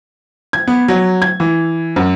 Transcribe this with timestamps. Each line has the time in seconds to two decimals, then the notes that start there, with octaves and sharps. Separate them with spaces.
0.53 G#6
0.68 B3
0.88 F#3
1.22 G#6
1.40 E3
1.96 F#2